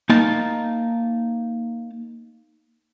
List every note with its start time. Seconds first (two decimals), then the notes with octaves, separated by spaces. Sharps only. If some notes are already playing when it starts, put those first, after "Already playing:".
0.10 A#3 D#4 A5